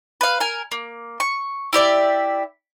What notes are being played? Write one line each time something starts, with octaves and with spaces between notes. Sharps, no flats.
B4 F5
A#4 G#5
A#3
C#6
E4 G4 D5 E5